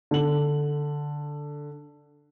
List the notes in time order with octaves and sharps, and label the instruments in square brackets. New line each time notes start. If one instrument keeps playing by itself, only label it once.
[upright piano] D3 F#7